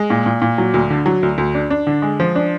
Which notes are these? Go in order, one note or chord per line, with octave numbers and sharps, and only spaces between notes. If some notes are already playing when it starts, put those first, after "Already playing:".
Already playing: G#3
A#2
A#2
A#2
F#3
D2
D3
F#3
D2
D2
D4
D4
D3
G#3
F3
D4